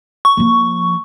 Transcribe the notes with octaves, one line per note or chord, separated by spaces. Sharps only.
C#6
F3 A#3